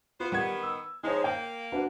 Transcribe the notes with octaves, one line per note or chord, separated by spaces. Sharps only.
B3 F4 C5
D#3 G3 B3 F#5 G#6
E6
F3 G#3 D#4 C5 C#5
A#3 G5
D4 F#4 B4